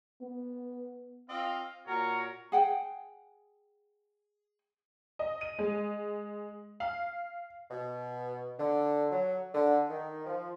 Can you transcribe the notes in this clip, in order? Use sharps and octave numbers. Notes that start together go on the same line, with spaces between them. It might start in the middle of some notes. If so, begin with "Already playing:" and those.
B3
C4 F4 D#5 F5
A#2 F#4 A#4 C#5 A#5
G#4 F#5 G5
D#5
D#7
G#3
F5
B2
D3
F#3
D3
D#3
F3